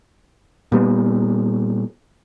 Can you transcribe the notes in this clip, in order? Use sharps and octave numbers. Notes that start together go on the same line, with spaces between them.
A#2 G3 B3